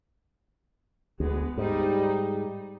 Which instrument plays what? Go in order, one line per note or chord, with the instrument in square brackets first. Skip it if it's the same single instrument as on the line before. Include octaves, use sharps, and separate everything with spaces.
[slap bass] D2 [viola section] G#3 B3
[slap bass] G#2 [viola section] G3 D#4